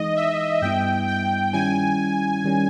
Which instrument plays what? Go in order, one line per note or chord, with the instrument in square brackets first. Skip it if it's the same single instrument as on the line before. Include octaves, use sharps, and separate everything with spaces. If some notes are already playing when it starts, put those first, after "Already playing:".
Already playing: [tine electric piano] E3 G#3 D#4 [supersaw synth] D#5
[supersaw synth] E5
[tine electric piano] G2 G3 B3 E4 [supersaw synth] G5
[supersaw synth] G5
[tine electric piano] D#3 G3 C#4 E4 [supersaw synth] G#5
[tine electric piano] D#3 G3 C#4